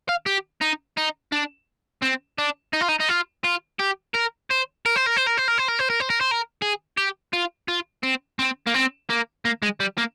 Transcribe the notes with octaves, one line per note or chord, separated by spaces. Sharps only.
F5
G4
D#4
D#4
D4
C4
D4
D#4
F4
D#4
D#4
F4
F4
G4
A#4
C5
A#4
C5
A#4
C5
A#4
C5
A#4
C5
A#4
C5
A#4
C5
A#4
C5
A#4
G#4
G4
F4
F4
C4
C4
A#3
C4
A#3
A#3
G#3
G3
A#3